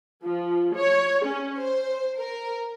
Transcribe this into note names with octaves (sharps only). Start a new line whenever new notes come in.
F3
C#5
C#4
C5
A#4